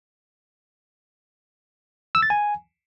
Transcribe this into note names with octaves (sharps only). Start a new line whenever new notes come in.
E6
A6
G#5